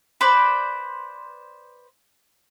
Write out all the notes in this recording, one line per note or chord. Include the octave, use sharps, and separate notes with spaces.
B4 C5 D5